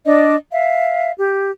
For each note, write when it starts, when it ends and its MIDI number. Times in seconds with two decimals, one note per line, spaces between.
0.05 0.35 62
0.05 0.35 74
0.05 0.35 75
0.51 1.11 76
0.51 1.11 77
1.18 1.50 67